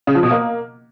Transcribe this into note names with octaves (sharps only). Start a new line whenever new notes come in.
C#3
F3
B2
A#3